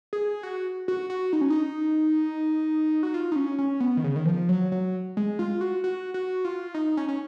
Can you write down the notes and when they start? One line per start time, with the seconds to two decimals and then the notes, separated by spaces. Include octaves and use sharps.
0.13 G#4
0.43 F#4
0.88 F#4
1.10 F#4
1.33 D#4
1.41 C#4
1.50 D#4
3.03 F#4
3.14 F4
3.32 D#4
3.36 C#4
3.59 C#4
3.80 B3
3.97 D#3
4.04 C#3
4.16 D#3
4.26 F3
4.49 F#3
4.72 F#3
5.17 G#3
5.39 F4
5.61 F#4
5.84 F#4
6.14 F#4
6.45 F4
6.74 D#4
6.97 C#4
7.08 C#4